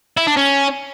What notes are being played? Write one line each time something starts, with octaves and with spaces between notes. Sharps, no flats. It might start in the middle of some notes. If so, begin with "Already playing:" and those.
E4
D4
C#4